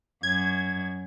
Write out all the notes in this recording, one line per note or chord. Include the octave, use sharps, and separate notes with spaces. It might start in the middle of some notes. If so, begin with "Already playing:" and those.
F#2 G#6